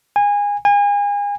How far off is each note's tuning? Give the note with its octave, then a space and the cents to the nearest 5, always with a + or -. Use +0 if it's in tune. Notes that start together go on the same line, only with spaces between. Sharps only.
G#5 -25
G#5 -35